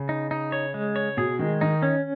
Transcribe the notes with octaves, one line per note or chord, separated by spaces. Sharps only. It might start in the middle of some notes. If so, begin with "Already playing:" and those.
Already playing: C#3
D#4
D#4
C#5
G#3
C#5
B2 G#4
D#3 G#3
D#3 D#4
C#4